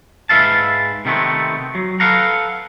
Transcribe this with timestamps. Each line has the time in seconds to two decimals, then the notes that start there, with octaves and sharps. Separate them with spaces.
0.29 G#2 B4 E5 F5 A5
1.05 C3 D#3 G3 A3 B3 C4
1.75 F#3
2.00 A4 B4 F5 F#5 A#5